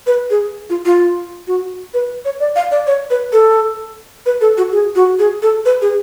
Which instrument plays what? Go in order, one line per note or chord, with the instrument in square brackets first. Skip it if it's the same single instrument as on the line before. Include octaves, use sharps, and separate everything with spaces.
[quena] B4
G#4
F4
F4
F#4
B4
C#5
D5
F5
D5
C#5
B4
A4
B4
A4
F#4
G#4
F#4
G#4
A4
B4
G#4